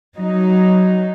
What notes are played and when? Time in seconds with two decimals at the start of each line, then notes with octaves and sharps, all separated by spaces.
0.16 F#3 D#4